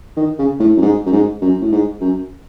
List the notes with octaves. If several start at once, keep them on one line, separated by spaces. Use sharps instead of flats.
D#3
C#3
A2
F#2
G#2
F#2
G#2
F#2
A2
G#2
F#2